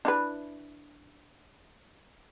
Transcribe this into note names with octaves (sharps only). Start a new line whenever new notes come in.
D4 E4 B4